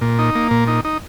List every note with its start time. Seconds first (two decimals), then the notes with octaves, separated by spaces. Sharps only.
0.01 A#2
0.19 D#4
0.35 A#3
0.51 A#2
0.68 D#4
0.85 D#4